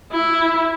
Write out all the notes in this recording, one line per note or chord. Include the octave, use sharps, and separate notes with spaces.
E4